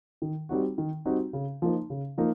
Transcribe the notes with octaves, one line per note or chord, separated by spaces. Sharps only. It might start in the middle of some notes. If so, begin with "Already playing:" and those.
D#3
G3 C4 D#4 F#4
D#3
G3 C4 D#4 F#4
C#3
F3 A#3 D#4
C#3
F3 A#3 D#4